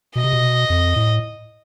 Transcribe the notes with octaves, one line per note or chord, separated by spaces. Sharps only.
B2 D#5
C3
B2
F2
A2